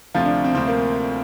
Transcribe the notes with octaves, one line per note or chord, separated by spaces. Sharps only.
D2 C3 F3 F4
D4
C4
D2 C3 F3 C4
A#3